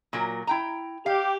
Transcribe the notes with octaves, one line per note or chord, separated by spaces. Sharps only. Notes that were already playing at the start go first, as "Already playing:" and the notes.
A#2 F#3 A#4
E4 G5 A#5
G4 F5